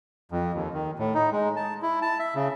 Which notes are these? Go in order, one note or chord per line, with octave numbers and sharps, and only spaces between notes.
F2
D#2
D#3
A2
D#4
G#3
A5
E4
A5
E5
C#3